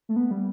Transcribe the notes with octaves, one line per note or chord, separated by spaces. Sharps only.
A3
B3
G3